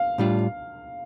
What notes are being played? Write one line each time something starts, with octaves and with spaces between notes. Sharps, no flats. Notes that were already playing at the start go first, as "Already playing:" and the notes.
Already playing: F5
A2 G3 D4 F4